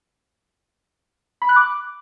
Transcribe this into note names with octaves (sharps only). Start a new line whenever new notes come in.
B5
F#6
D6